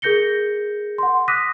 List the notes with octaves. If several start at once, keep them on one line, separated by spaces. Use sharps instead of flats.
G#4 A#4 G6 A#6 C#7 G7
F#5 C6
D6 D#6 F#6 A#6 B6 D#7